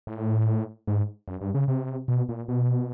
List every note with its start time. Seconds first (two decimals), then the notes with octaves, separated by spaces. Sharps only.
0.07 A2
0.88 G#2
1.28 F#2
1.41 G2
1.54 C#3
1.68 C3
2.08 B2
2.29 A#2
2.48 B2